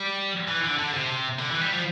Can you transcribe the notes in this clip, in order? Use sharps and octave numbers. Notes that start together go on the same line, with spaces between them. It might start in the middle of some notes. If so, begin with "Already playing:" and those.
Already playing: G3
E3
D3
D3
C3
D3
E3
G3
F3